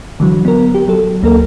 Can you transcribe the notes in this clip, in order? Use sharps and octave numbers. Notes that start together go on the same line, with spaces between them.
D3 E3 F#3
B3 A#4
G4
F#3 A4
D2 A#3 A4 A#4